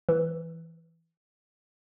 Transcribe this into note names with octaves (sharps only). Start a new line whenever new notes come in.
E3